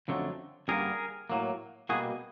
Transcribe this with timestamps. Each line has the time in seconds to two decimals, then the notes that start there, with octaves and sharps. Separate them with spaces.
0.08 F2 D3 F#3 A3
0.68 G2 D3 G3 A#3 G#4 A#4
1.30 A2 F#3 A#3
1.89 B2 G3 A#3 F#4 G#4